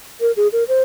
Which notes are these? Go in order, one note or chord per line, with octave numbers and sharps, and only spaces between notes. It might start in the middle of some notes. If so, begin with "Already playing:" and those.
A#4
G#4
A#4
C5